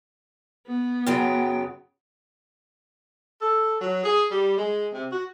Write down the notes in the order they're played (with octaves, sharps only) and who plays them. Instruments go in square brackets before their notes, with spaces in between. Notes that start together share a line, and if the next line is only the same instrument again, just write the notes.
[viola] B3
[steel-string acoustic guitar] F#2 C#3 F#3 [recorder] G5
[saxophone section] A4
F#3
G#4
G3
G#3
C3
F#4